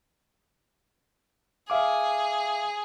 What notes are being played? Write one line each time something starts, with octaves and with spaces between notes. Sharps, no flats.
G#4 E5 F5 D6